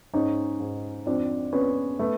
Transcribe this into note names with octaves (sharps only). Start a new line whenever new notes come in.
G#2 C#4 D#4
G#2
F2 C4 D4
F2 B3 C#4
A3 B3